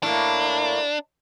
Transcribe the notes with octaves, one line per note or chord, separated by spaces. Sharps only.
A2 A#3 D4